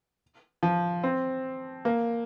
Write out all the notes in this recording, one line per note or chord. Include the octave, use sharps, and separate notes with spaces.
F3
C4
A#3